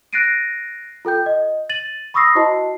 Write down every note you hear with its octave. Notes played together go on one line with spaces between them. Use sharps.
F#6 A6 A#6 C7 D7 D#7
F4 A4 G5 G6
D#5
A6 D#7 F#7
B5 C#6 D#6 E6 A#6 C7
E4 F#4 C5 D#5 A5 C7